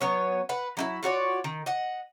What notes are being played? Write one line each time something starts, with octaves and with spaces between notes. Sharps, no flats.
F#3 B3 C#5
B4 F#5
F#3 D#4 E4
F4 F#4 C#5 D5
D#3
D#5 F#5